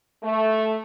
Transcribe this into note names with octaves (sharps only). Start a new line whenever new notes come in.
A3